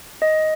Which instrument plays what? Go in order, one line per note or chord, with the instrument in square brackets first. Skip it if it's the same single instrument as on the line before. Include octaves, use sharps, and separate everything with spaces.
[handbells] D#5